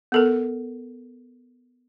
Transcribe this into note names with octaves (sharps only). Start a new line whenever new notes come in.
B3 A4 A#4